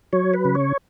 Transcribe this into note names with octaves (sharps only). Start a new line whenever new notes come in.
F#3 C#5
B4
C#3
C#5